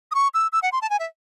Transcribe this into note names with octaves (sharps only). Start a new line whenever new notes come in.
D#6
C#6
E6
E6
F#5
C6
A5
G#5
E5